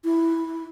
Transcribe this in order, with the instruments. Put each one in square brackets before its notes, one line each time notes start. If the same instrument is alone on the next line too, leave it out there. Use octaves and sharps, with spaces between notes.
[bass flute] E4